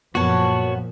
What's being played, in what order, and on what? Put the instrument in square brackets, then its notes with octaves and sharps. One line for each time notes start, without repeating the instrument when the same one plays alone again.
[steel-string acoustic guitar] F#2 B3 A5 [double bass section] A#2 F3 [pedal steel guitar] F#4 C#5